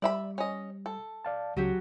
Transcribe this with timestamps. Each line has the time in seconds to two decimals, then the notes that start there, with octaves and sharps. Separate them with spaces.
0.02 G3 D5 E5 B5
0.38 C#4 D#5
0.86 A4
1.25 D5 F5 A5
1.56 C#2 C#3 F#3 F#4 G4